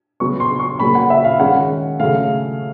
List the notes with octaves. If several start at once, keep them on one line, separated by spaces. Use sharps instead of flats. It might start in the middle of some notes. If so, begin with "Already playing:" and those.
C#3 F#3 B3 C#6
C6
C#6
C#3 F#3 A#3 B5
F#5
E5
F5
D#3 G#3 C#4 F#5
C#3 F#3 A3 F5